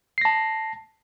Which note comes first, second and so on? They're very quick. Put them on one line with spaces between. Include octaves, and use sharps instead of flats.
C7 A#6 A5